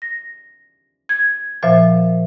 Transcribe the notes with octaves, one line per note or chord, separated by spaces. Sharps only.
A#6
G#6
A#2 F3 C5 E5